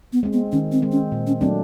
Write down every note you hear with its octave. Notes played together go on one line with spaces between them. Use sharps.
B3
G#3 C4
B3
D#3 C#4
C4
G#3 C4
C#4
A#2
C#4
F#3 A3 C4 D4